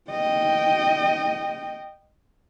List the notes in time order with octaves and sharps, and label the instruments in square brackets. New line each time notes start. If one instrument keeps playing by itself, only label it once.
[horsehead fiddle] D#5 G5